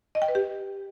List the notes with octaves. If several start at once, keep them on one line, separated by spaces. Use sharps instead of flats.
D#5
G5
B4
G4